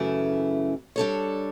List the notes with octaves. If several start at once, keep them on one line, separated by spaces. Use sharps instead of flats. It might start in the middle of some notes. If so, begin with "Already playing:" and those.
Already playing: F#2 C#3 E3 A3 E4
G3 D4 A4 C#5